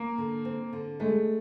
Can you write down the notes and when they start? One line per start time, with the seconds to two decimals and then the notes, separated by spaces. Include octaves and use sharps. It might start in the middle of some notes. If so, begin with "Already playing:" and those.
Already playing: A#3
0.18 D3
0.45 C4
0.73 D3
1.00 G#3 A3